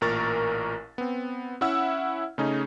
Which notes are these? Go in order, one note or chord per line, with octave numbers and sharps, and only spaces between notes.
A1 A#2 A#4 C#6 A6
B3 C4
C#4 E4 E5 F#5 E6
C#3 A3 C#4 D#4 G#4